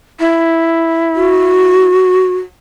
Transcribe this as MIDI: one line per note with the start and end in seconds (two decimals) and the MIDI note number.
0.19 1.87 64
1.16 2.36 66